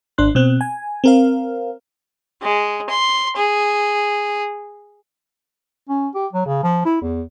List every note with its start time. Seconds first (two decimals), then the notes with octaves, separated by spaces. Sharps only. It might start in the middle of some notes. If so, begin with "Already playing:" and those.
0.18 G#1 D4 C6 F#6
0.35 B2 C4 F#6
0.61 G#5
1.04 C4 A#4 F5
2.42 G#3
2.90 C6
3.37 G#4
5.89 C#4
6.14 G4
6.33 F#3
6.46 C#3
6.63 F3
6.85 E4
7.02 E2